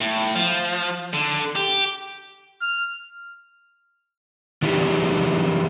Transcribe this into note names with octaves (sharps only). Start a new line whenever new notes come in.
A2
F3
D3
G4
F6
D#3 E3 D4 G4 G#4